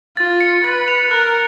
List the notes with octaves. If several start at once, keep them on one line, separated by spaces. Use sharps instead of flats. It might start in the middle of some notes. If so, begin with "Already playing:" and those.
F4 A6
C#7
B4 A6
F7
A#4 F#6